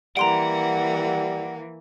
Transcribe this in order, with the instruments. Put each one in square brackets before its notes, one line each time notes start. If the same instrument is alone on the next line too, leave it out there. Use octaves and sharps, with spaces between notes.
[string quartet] E3 A#3 [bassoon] G3 [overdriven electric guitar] F#5 [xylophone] A#5 C6 D7